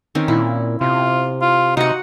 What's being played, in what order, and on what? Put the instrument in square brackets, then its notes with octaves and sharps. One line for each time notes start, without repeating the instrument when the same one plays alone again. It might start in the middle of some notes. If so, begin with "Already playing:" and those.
[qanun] D#3 C4 C#4
[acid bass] A#2 [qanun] E4
[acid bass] C3 [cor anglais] F4
[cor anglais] F4
[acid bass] C3 [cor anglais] D#4 [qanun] F#4 F#5